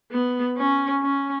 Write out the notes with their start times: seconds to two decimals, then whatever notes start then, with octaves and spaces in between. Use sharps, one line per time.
0.12 B3
0.58 C#4
1.02 C#4